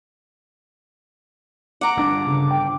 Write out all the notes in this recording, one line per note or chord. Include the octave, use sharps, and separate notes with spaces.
F#5 A#5 D6
G1 D4
C#3
G5